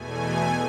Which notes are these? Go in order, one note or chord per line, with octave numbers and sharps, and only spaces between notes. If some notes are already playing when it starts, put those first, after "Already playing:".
Already playing: E2 B2 A3 G#5